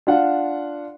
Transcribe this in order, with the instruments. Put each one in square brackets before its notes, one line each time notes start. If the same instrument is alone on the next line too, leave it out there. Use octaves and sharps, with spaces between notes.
[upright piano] D4 F4 F5 F#5